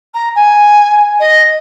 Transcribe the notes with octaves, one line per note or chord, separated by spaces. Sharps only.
A#5
G#5
D#5